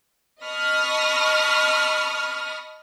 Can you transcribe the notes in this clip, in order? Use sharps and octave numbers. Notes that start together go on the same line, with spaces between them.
D#5 A5 B5 C#6 D#6 F6